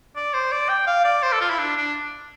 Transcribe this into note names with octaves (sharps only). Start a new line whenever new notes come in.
D5
C5
D5
G5
F5
D5
C5
A4
F4
E4
D4
D4